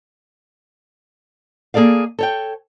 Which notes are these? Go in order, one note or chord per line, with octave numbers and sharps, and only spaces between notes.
A#3 G#4 A4 D5 F5
A4 C#5 G5